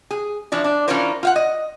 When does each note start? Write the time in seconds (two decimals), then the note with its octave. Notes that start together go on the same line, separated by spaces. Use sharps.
0.11 G#4
0.52 E3 F3 D4
0.64 D4
0.88 E3 C#4 D4 F4 A#4 C5
1.23 F4 F5 F#5
1.36 D#5